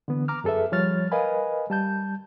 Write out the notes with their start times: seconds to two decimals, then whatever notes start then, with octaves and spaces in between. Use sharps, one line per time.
0.08 D3 E3 B3
0.28 A#5 D6 F6
0.44 F#2 G#4 A4 B4 E5
0.72 F3 G3 C#5 F6 A6
1.12 A#4 B4 D#5 F5 G#5 B5
1.70 G3 A5 G6